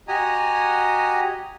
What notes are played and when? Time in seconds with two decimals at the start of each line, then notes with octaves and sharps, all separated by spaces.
0.08 F#4 G4 D#5 G#5 A#5